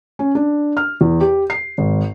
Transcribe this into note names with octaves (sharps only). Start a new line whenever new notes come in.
C#4
D4
F6
E2
G4
C7
G#1